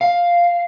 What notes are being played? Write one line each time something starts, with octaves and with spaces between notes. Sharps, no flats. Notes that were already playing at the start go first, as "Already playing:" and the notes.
F5